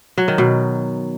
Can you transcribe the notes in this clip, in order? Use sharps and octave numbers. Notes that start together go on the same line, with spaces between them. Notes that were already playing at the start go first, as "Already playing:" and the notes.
F#3
D#3
B2